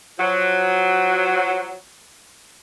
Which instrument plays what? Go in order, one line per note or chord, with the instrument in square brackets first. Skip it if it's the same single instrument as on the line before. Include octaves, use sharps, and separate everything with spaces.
[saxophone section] F3 F#3